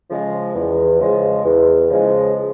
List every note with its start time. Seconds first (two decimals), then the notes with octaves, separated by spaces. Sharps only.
0.10 C#3 F3 G#3
0.54 E2
0.99 C#3 F3 G#3
1.44 E2
1.90 C#3 F3 G#3